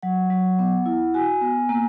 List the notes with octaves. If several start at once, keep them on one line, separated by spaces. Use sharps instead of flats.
F#3 F#5
F#3
B3
E4
F#4 G#5
B3
A#3